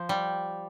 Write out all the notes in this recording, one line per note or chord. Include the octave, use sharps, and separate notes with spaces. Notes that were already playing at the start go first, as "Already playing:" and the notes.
Already playing: F3
G3